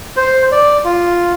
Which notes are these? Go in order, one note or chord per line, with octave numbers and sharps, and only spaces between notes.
C5
D5
F4